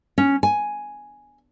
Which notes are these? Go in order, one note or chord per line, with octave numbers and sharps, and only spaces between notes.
C#4
G#5